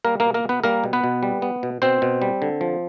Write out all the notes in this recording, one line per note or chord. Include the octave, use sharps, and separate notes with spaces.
G3 A#3 A#4
B2 A#3 A#4
A#3 A#4
B2
B3 B4
G3 A#3 A#4
B2
B3 B4
B2
G3
B3
B2
B2 C4 C5
B2
G3
D3
F3